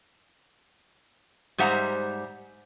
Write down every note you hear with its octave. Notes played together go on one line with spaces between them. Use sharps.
G#2 G3 C5 E5 F#5 A#5